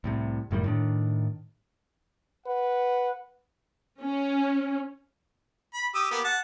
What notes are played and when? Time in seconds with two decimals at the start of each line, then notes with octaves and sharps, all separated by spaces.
0.04 C2 A2 C3
0.51 F#1 A2 D#3 G3
0.64 A2 D#3 D4
2.46 B4 F#5
4.01 C#4
5.74 B5
5.95 G4 D#6 E6
6.11 A#3 B3 G4
6.24 F#5 A5